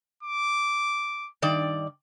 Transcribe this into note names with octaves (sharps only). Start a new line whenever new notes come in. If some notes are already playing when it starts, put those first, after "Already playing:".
D6
G2 D#3 D5